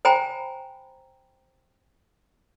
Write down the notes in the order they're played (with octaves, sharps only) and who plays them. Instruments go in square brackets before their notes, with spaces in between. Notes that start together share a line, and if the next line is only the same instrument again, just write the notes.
[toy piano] C5 G5 G#5 A#5 B5